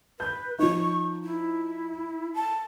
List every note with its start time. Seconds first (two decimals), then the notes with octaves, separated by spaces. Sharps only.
0.20 B4 G6
0.59 F3 D#4 C#6
1.24 E4
2.34 A5